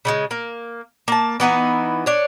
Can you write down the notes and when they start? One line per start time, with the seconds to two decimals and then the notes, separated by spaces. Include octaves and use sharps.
0.05 C#3 G3 G#3
0.31 A#3
1.08 A#3 A5
1.40 E3 B3 D#4 E4
2.06 D4 C#5